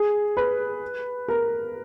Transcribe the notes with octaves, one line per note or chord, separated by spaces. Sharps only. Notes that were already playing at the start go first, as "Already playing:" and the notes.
Already playing: G#4
B4
A#4